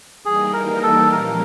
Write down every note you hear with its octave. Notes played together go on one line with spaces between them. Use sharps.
E3 G3 A#3 D#4 G4 G#4
A#4
A4
A#2 F3 G#3 C#4 A#4